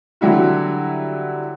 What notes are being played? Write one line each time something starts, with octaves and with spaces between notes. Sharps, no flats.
D3 F#3 G3 E4 F#4